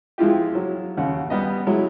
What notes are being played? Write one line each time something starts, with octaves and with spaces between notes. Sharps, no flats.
F3 G#3 E4 F4 G4
F#3
D#2 C#3 F#5
G3 B3 D#5
F#3 G#3 E4